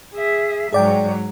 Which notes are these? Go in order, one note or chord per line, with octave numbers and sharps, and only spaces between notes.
G#4 E5
G#2 F#3 G#4 D5 G5